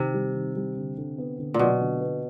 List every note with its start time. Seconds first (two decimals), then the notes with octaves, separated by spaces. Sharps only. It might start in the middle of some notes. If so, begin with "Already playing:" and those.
Already playing: C3 D#3
0.14 G3
0.35 D#3
0.56 G3
0.77 D3
0.98 D3
1.18 B3
1.39 D3
1.54 A#2
1.59 B2 F#3
1.81 D3
2.01 B3